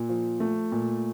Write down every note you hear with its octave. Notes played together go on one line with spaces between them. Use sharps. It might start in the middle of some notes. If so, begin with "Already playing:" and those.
Already playing: A#2
F3
A3
A#2